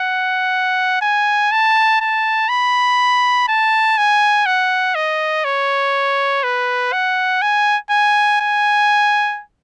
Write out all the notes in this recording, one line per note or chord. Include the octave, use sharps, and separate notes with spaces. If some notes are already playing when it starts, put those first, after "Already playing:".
Already playing: F#5
G#5
A5
A5
B5
A5
G#5
F#5
D#5
C#5
B4
F#5
G#5
G#5
G#5